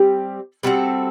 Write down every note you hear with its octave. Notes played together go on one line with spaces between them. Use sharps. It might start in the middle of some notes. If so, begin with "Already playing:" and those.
Already playing: G3 C4 G4
G3 C4 F#4 A4